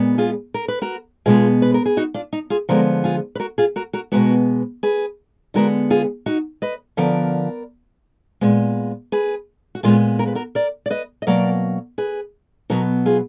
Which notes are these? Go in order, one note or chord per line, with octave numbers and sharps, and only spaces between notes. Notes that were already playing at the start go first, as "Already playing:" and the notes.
Already playing: A#2 G#3 B3
F4 G#4
A#4
B4
F#4 A#4
B2 G#3 B3 F4 G#4
B4
A#4
G#4
D#4 F#4
D4 F4
D#4
F4 G#4
D3 F3 G#3 B3 F#4 A#4
F4 G#4
B4
F#4 A#4
F4 G#4
F#4 A#4
F#4 A#4
B2 G#3 B3 F#4 A#4
G#4 B4
D3 G#3 B3 F#4 A#4
F4 G#4
D#4 F#4
B4 D#5
D3 F3 B3 A#4 D5
A#2 G#3 B3
G#4 B4
F#4
A#2 G#3 B3 F4 G#4
A#4
B4
F#4 A#4
A#4 D5
D5
B4 D#5
D#5
B2 F#3 A#3 A#4 D5
G#4 B4
B2 F#3 B3 F#4 A#4
F4 G#4